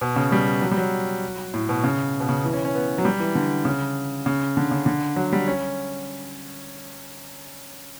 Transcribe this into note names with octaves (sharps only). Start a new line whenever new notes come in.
B2
C#3
G3
F#3
G3
F#3
A2
B2
C#3
B2
C#3
E3
C#4
C#4
B3
F#3
G3
E3
D3
C#3
C#3
D3
C#3
D3
F#3
G3
C#4